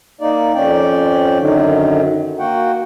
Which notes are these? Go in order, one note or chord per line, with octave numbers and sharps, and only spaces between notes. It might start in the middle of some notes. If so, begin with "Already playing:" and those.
A#3 D#4 D5
F2 C#4 D5 G5
F#2 D3 D#3 F#3
A#3 F#4 F#5 G5